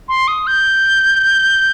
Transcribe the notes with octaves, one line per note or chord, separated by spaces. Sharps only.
C6
D#6
G6